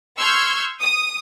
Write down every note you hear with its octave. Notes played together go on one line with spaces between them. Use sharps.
C6 C#6 E6 F6 G6 G#6
D#6